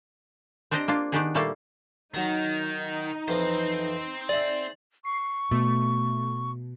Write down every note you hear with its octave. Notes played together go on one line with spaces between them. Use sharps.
C4 D4 G4 C5 D#5 A#5
A#3 D4 F4
D#3 B3 D4 D#4 G4 G#4
A#2 G3 A3 A#3 A4 F5
D#3 F#3 D#4 A#5
F2 E3 F3 C4 C5
G#4 D5 E5
C#6 C7
B2 A3